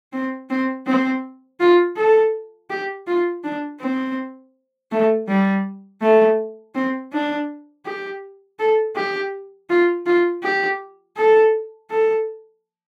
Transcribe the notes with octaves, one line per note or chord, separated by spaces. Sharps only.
C4
C4
C4
F4
A4
G4
F4
D4
C4
A3
G3
A3
C4
D4
G4
A4
G4
F4
F4
G4
A4
A4